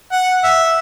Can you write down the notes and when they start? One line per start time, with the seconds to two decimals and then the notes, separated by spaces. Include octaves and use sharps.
0.12 F#5
0.44 E5